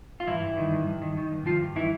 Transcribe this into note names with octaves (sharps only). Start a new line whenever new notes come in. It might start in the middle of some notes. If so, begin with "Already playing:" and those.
F4
G2 E3 E4
G2
D#3
G2
G2
D#3
D#3
G2
D#3 F3 F4
G2
D#3 E3 E4